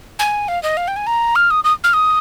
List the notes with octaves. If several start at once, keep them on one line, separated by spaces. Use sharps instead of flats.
G#5
F5
D#5
F5
G5
G#5
A#5
F6
D#6
D#6
F6
D#6